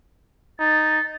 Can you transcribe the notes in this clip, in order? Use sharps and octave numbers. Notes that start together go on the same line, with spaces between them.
D#4 A6